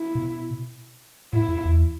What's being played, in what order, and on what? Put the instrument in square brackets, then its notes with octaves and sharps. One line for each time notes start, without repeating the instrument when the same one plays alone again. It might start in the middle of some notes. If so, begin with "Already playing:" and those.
Already playing: [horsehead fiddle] E4
[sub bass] B2
[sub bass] A2 [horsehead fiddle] E4
[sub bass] F#2
E2